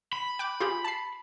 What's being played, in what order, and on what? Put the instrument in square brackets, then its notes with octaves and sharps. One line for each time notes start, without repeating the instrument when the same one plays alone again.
[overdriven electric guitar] B5
[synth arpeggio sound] G5 D6 F#6
F4 G4 G#4
A5 C7